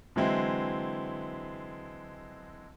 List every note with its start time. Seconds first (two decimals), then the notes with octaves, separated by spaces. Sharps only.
0.16 D3 E3 F#3 G#3 C4 E4